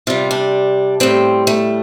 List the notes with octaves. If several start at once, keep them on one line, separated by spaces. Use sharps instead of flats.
C3 G3 F4
D4
A2 G3 C4
A3